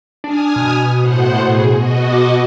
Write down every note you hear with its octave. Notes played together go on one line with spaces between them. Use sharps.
D4 G#5 D#6 F6
B2
A2 C5 F#5
G#4
B2 F#4 D#5
D6